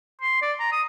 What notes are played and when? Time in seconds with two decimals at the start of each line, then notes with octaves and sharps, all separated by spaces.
0.22 C6
0.42 D5
0.60 A#5
0.72 D#6